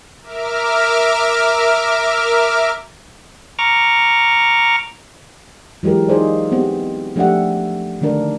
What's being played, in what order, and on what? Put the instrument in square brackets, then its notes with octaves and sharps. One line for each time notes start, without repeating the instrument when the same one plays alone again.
[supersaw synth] A#4 E5 D6 F6
[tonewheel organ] A#5 C#6 D6 F6
[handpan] E3 F#3 G#3 G4 A#4
D#4 F4 G#4 C5 D5
B3 C4 G4
F3 A3 D4 G4 E5 F#5
D3 D#3 A3 D4 A#4